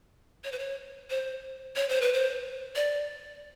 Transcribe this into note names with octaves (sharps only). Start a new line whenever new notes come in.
C#5
C5
C#5
C5
C#5
C5
B4
C5
D5